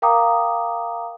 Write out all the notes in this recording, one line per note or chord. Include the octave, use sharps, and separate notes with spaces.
A#4 F5 G5 A#5 D6 D#6